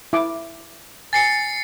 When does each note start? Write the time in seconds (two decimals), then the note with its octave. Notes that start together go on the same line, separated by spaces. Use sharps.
0.13 E4 D6
1.13 G#5 A6 C7 C#7